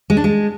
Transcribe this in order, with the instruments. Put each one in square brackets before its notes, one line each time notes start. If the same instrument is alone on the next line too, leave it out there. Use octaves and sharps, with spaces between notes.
[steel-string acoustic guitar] G#3
D4
G#3